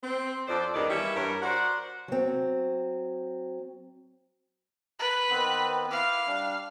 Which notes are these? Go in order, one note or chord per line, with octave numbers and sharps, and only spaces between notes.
C4
F2 C5 D5
E2 G2 D#3 D4 D#4 D5
E3 G3 A#3 C#5 E5
G2 A#4 C#5
F#4 A#4 C5 D5 F#5
F#3 C4
B4
D#3 B3 C4
E4 B4 F5 D6
G3 D4